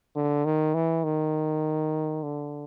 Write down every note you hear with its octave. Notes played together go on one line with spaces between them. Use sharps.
D3
D#3
E3
D#3
D3